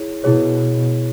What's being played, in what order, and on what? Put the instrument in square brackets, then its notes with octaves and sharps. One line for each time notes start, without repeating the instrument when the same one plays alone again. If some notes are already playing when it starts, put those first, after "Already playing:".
Already playing: [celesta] E4 G#4 C#5
[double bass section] B2 [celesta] E4 G#4 C#5